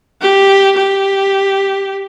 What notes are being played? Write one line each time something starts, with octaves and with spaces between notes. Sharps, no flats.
G4
G4